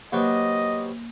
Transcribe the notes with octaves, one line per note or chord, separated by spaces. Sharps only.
C3 F#3 A#3 B3 D#5